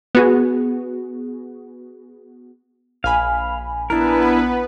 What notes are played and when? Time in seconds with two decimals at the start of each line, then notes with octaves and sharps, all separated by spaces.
0.15 B3 F#4 G#4
3.04 A#1 F5 G#5 B5
3.90 B3 D4 E4 A#4 B4